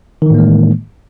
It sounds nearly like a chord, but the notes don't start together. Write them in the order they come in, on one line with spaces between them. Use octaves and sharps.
D#3 E3 A2 A#3 G#3